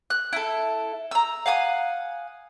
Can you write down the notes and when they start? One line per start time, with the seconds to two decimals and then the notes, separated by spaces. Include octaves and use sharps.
0.10 F#6
0.33 E4 A4
1.11 A#5 E6
1.46 F5 F#5 G#5 D#6